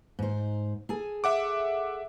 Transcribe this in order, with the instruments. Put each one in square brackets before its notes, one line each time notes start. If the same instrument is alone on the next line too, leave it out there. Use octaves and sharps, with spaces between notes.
[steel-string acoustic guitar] G#2 C5
G#4 A4 G#5
[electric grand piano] E5 F#5 D6